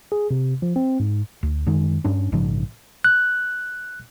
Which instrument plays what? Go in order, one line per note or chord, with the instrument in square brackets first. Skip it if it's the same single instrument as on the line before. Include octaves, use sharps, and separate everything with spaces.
[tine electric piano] G#4
C3
F3
C4
G#2
[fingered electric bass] D2
F#2 D#3 G#3
G2 C#4 D4
A#1 G#2 C#3 F3
[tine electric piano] F#6